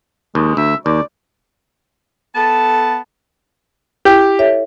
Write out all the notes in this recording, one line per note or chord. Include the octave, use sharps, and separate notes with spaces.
D#2 G#3
D2 E5
D#2 D5
B3 A4 A5
E4 G4 G5
A4 C#5 E5